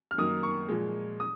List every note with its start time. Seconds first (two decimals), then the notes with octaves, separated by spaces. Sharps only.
0.11 F6
0.18 F#2 D#3 A#3 D#6
0.43 C#6
0.69 A#2 F3 G#3
1.20 D#6